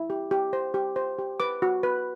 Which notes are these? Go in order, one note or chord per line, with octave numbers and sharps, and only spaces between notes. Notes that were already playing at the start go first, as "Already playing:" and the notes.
Already playing: E4
G4
G4
C5
G4
C5
G4
B4 D6
F#4
B4